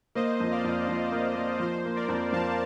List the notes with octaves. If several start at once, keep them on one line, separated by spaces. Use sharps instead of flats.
A#3 C5 D#5
F2
D5 F5
F2
F2
A#3
A#3
F3 C5
A#3
A#4 D5
F2
F2 F5 A5